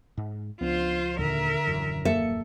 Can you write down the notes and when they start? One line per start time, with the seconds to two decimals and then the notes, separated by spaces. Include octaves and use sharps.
0.17 G#2
0.61 C#2 F3 B3 D4 F4 C5
1.19 D#2 A#2 D3 A#4 E5
1.67 D#1 F#2 E3
2.05 A#3 A4 E5 C#7